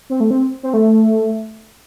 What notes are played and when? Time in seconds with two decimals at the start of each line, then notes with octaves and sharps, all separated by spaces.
0.10 C4
0.20 A3
0.31 C4
0.63 C4
0.74 A3